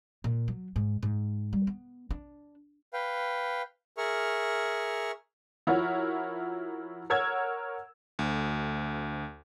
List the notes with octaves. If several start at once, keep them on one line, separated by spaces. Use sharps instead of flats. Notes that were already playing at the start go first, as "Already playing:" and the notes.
A#2
F#3
G#2
G#2
G3
B3
D4
B4 F5 G5
G#4 A#4 E5 C#6 F6
F3 E4 F#4 A#4 C#5
A#4 C#5 F#5 E6 G#6
D2